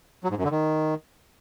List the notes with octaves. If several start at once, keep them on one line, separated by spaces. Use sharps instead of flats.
F#3
G#2
F#2
D3
D#3